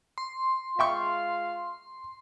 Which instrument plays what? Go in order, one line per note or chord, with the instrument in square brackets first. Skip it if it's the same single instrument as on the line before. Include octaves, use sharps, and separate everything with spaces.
[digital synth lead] C6
[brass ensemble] G#3 F4 F5 [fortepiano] E5 G5 C#6